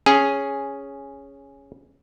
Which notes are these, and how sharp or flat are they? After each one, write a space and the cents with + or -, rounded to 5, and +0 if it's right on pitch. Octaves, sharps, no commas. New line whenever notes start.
C#4 +0 G#4 +0